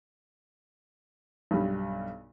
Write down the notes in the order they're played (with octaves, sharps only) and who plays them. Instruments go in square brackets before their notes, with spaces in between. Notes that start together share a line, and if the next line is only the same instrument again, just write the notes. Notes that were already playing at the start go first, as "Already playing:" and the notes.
[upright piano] B1 G2 G3